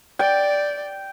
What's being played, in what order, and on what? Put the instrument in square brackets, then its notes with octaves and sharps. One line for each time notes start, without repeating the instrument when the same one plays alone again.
[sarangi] D5 [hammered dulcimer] G5